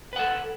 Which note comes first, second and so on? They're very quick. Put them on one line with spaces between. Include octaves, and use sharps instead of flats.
B4 F#5 A4